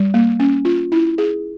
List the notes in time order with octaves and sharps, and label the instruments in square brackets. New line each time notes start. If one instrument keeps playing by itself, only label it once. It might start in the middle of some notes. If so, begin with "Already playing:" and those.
Already playing: [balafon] G3
A#3
C#4
F4
E4
G#4